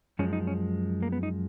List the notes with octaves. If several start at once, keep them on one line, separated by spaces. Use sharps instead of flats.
F#2 F3 G#3 C#4
D#4
C#4
A#3
B3
D#4